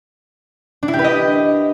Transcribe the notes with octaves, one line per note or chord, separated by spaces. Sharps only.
D4
E4
G4
B4
D#5